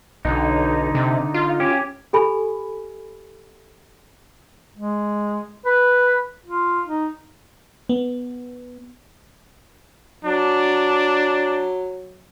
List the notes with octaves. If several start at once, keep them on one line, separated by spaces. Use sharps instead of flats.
B1 D3 D#4
C3
F4
C#4 G4
G4 A4 G#5 B5
G#3
B4
F4
D#4
B3
F#3 D4